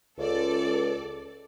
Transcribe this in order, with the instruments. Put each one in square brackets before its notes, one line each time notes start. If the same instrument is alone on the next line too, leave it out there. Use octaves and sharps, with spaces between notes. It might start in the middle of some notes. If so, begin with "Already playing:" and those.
[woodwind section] C#2 [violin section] A4 D5